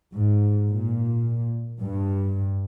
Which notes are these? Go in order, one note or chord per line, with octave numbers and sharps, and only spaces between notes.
G#2
A#2
G2